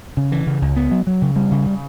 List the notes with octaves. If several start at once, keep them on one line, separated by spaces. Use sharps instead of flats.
C#3
E3
C#3
C#2
B3
F#3
F#3
C#3
G3
C#3
C#3